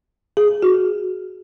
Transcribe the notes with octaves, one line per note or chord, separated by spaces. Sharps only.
G#4
F#4